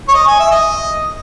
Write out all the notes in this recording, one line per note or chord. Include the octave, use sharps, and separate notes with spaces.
C#5
D#5
G#5
E5
D#5